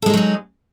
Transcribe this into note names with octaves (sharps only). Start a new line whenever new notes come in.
F#3 G#3 D#4 G#4 A4